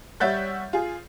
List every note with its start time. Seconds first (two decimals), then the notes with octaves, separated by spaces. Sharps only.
0.20 G3 C#5 E5 F#5 G6 A6
0.73 F4 G#4